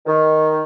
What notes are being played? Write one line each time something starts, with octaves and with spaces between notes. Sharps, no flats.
D#3